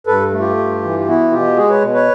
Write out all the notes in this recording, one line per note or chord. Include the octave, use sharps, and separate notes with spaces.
G2 A4 B4
A3
F4 G4
G2
E3
G4
B3 E4 F#4
B2 F4 G4
G#3 F#4 G#4
B4 C#5
B2
B4 C#5